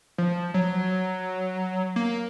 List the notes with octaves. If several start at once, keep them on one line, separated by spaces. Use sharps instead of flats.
F3
F#3
A#3